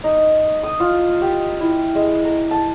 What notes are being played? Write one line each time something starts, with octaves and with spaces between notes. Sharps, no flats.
D#4
D#6
F4
G4
E4
G#3
A#4
A5